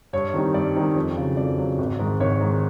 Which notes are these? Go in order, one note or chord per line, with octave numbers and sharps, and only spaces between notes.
G2 C#5
D#3 G3 C4 D#4
G2 D5
D#3 G3 C4 D#4
F2
C#3 F#3
F2 D5
C#3 F#3
G#1
G#2 D#3
G#1 C#5
G#2 D#3